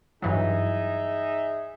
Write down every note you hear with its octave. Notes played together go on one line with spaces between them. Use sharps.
G2 E3 F#3 D#4 G#4 E5